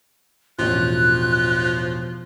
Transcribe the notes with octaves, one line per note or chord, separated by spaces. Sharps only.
E1 A1 F3 F#6